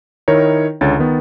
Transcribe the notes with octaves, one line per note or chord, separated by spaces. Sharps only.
D#3 D#4 E4 A#4 C#5
C#2 D3 C#5 A6
D#3 B3